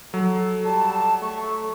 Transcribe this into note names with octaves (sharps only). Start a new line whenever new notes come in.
F#3 A4
G3 A5
A3 C#6